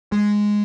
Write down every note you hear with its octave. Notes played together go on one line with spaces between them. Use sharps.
G#3